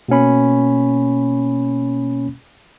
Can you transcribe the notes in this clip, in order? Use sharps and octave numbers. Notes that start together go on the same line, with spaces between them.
B2 A#3 C#4 B5